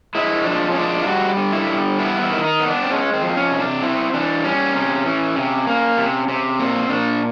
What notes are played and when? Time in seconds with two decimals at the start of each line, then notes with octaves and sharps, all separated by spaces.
0.15 G#3 E4
0.45 F3 D4
0.71 C#4
0.75 G#3 D4
1.02 F4
1.06 G3 F#4
1.37 D3
1.53 E4
1.69 G3
1.99 B3 E4
2.21 E4
2.30 D#3
2.44 D#4
2.60 B3
2.68 D4
2.83 C4
2.90 G#3 C#4
3.14 C4
3.22 F3
3.37 C#4
3.52 C3
3.60 D4
3.82 C4 E4
4.14 E3 D4
4.44 G3 C#4
4.75 C3
5.06 E3
5.36 C3
5.67 A#3
5.98 C3
6.28 C3
6.59 A#2 C4
6.89 A#2 D4